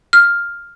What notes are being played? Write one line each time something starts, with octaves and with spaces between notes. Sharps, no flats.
F6